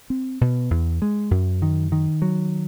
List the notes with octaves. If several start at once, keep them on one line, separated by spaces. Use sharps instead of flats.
C4
B2
E2
G#3
F#2
D#3
D#3
F#3